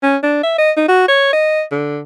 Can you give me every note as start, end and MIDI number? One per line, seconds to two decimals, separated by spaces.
0.03 0.17 61
0.23 0.42 62
0.43 0.54 76
0.58 0.71 75
0.77 0.84 63
0.88 1.04 66
1.08 1.30 73
1.33 1.63 75
1.71 2.01 50